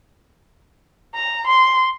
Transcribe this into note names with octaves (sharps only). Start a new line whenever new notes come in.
A#5
C6